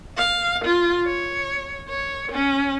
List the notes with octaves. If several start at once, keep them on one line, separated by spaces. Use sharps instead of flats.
F5
F4
C#5
C#5
C#4